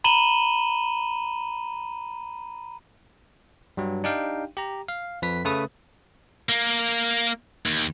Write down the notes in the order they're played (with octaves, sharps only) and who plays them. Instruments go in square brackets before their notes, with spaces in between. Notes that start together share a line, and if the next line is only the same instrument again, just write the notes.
[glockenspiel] A#5 B5 D#7 E7 F#7 G7
[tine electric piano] G2 F#3
D4 D#4 G4 F5 G5
G4 A#5
F5
F2 B4 B6
C#3 A3 B4 D#6
[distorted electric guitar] A#3
D#2